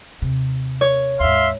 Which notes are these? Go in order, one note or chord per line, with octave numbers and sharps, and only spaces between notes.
D#2 C3
C#5
D#2 G#2 E5 F5 C6